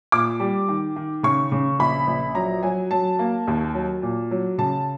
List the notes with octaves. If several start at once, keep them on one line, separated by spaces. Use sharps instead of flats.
A#2 D6
G3
D#3
D#3
C#3 C#6
C#3
A#1 B5
A#1
F#3 A#5
F#3 G#5
F#3 A5
A#3
D#2
F#3
A#2
F#3
C#3 A5